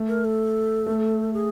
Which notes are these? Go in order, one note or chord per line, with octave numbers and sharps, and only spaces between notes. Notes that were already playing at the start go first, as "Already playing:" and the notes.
Already playing: A3
A#4
A4
A3
G#4